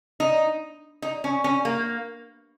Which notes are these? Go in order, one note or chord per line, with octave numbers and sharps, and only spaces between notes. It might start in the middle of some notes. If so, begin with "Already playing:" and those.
D#4
D#4
C#4
C#4
A#3